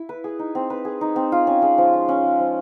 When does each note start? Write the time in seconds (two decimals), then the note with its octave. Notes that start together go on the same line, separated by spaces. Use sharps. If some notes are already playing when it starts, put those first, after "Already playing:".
Already playing: E4
0.09 B4
0.24 G#4
0.39 D#4
0.55 C4
0.70 B4
0.85 G#4
1.01 D#4
1.16 C4
1.32 F4
1.47 C#4
1.62 G#3
1.78 F3
1.93 F4
2.09 C#4
2.24 G#3
2.39 F3